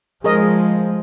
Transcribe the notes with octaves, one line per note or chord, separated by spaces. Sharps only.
F3 G#3 G#4 A#4 D#5